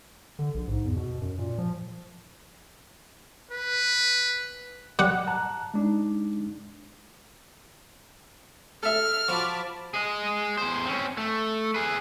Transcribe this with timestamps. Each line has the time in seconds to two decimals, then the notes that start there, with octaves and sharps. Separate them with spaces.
0.39 D3
0.54 A#1
0.68 G#2
0.85 E2
0.96 B2
1.21 F#2
1.39 A#2
1.58 F3
3.51 B4
4.99 G3 F#5
5.28 A5 A#5 F#6
5.74 G#3 D4 D#4
8.83 A4 E5 F6
9.28 F3 F#4 A5 B5 D6
9.94 G#4 D#5
10.58 E2 C5
10.85 C4 C#4
11.17 A3
11.74 G#4 B4